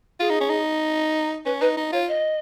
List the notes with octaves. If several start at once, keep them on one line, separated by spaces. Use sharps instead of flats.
F4 G#4
D#4
C#4
D#4
C#4 B4
D#4 B4
D#4
F4 C#5
D#5